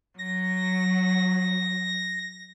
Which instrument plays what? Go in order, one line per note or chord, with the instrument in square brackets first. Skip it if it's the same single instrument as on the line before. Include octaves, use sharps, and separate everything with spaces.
[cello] F#3 [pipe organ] A#6